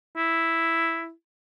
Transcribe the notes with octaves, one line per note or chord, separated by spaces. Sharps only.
E4